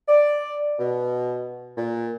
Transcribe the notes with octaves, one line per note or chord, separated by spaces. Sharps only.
D5
B2
A#2